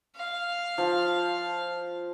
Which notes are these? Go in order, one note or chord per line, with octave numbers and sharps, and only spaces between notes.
F5
F3